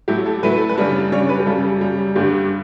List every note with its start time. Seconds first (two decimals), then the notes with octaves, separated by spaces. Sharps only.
0.08 A2 F#3 A3 E4 G4
0.26 A4
0.42 A2 F#3 A3 E4 B4
0.56 A4
0.69 B4
0.77 F#2 C#3 G3 D4
1.12 F#2 C#3 G3 D4 C#5
1.29 B4
1.40 G4
1.46 F#2 C#3 G3 A4
1.81 F#2 C#3 G3
2.15 G2 D3 G3 G4